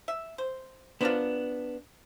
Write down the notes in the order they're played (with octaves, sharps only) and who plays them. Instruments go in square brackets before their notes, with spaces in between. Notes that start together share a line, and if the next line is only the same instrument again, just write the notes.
[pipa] E5
C5
[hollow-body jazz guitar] B3 D4 [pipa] F4 A#4 C5